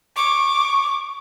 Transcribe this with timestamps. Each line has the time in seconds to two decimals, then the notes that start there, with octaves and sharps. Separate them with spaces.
0.17 C#6 D6